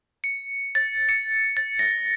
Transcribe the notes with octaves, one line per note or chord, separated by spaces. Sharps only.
C#7
A6
C#7
A6
A#6